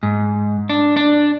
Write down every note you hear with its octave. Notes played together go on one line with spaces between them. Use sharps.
G#2
D4
D4